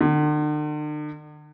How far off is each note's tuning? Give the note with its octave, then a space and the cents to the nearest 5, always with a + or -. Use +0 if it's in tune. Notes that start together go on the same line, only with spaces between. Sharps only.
D3 +45